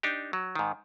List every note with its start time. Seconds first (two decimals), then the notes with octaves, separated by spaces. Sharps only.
0.03 D4 D#4 G4
0.33 F#3
0.55 G#2 D#3